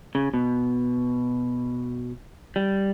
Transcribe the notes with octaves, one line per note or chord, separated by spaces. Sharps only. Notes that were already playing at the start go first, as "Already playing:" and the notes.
C#3
B2
G3